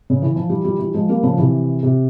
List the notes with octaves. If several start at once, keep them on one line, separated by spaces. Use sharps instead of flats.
C#3
E3
F3
E3 G3
E3 G3
E3 G3
F3 G#3
G3 A#3
C#3 F3
C3 E3
C3